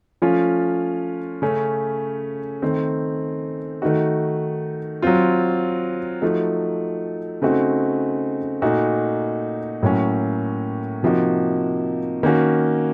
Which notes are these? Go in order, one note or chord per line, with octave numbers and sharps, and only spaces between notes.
F3 A3 C#4 F4
C#3 A3 C#4
D#3 A3 C4
D#3 A3 D#4 F#4
F#3 C4 F4
F3 A3 D#4 F#4
C#3 A3 C4 D#4 F#4
A#2 A3 D#4 F#4
A2 F#3 A#3 C#4
C3 F3 A#3 D#4 F#4
D#3 A#3 C#4 F#4